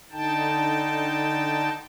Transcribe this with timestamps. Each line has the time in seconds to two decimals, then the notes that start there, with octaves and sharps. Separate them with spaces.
0.12 D3 D#4 G5 A5